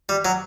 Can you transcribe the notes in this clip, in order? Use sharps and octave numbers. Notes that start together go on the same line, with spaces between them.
G3
F#3